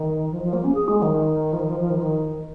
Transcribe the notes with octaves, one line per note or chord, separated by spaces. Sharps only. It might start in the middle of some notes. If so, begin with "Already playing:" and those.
Already playing: D#3
F3
F3
A#3
C#4
G#4
G#3
D#3
F3
D#3
F3
F3
D#3
F3
D#3